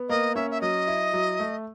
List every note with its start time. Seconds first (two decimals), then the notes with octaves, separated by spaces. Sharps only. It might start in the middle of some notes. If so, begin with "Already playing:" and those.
Already playing: B3
0.09 A#3 D#5
0.35 C#4 E5
0.51 E5
0.61 F#3 D#5
0.87 E4
1.13 F#3
1.40 A3